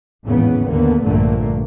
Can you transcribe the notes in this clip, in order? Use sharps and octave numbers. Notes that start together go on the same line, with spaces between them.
G#1 E2 A2 C#3 E3 B3
D#2 D3 A#3 B3
A#1 G2 A#2 D3 A3 A#3